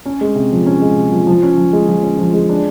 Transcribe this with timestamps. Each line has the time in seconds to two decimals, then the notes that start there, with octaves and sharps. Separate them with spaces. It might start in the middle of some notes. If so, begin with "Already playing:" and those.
0.06 C#4
0.21 G#3
0.35 C3
0.52 F3
0.66 C#4
0.82 G#3
0.97 C3
1.12 F3
1.27 F3
1.43 C#4
1.58 F3
1.73 G#3
1.89 F3
2.03 C#4
2.19 F3
2.34 G#3
2.49 D4